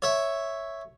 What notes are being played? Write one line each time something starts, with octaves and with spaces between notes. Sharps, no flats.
C#5 E5